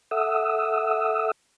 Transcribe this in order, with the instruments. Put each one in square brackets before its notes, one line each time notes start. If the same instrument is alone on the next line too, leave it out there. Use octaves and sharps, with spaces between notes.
[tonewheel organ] A4 E5 F#5 D#6 E6